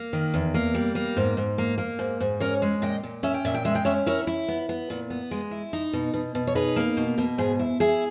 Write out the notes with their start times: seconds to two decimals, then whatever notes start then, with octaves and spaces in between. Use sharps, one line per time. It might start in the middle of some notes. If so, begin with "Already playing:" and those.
Already playing: A#3
0.13 D#3
0.34 E2
0.54 A#3
0.74 G3
0.95 A#3
1.17 G#2
1.37 G#2
1.58 A#3
1.78 A#3
1.99 G#2
2.20 G#2
2.40 C#4 A#4 C#5
2.62 G#3
2.82 A#2 D#5 G5
3.03 A#2
3.23 C#4 E5
3.34 G5
3.45 A#2 E5
3.54 G5
3.65 G#3 E5
3.75 G5
3.85 C#4 C#5 E5
4.06 E4 A#4 C#5
4.27 E4
4.48 B3
4.69 B3
4.90 A#2
5.10 B3
5.31 G#3
5.51 E4
5.73 D#4
5.93 B2
6.14 B2
6.35 B2
6.47 C#5
6.55 D#4 G#4 B4
6.76 A#3
6.97 B2
7.18 B2
7.38 G#2 G#4
7.59 E4
7.80 E4 G#4